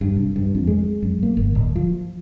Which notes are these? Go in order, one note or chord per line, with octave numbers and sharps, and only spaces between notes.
G2
C2
G2
F2
G#3
F#2
A#3
G1
D1
F3